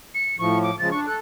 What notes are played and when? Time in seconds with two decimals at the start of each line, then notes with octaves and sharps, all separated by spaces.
0.15 C#7
0.39 A2 F3 C#6
0.63 D6
0.79 C#3 F3 G#3 A6
0.91 D4 C#6
1.07 A4 F#6